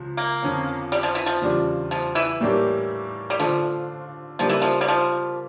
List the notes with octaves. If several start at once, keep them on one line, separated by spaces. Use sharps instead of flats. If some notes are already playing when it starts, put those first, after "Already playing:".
Already playing: C#2 C#3 F3
A#3
F2 D3 F3 C#4
G3
F3
E3
F3
E2 C#3 G3 D4 F4
F3
E3
A2 G3 A#3 D4 G4
G3
D3 F3 A3 D4 F4
C#3 F3 G3 A#3 D4
E3
F3
G3
F3